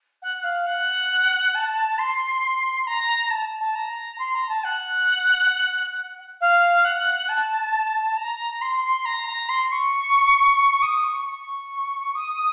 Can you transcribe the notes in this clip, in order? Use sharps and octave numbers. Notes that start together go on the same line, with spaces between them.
F#5
F5
F#5
A5
C6
A#5
A#5
A5
A5
A#5
C6
A#5
A5
F#5
F5
F#5
A5
A#5
C6
C6
A#5
A#5
C6
C#6
D#6
C#6
C#6
D#6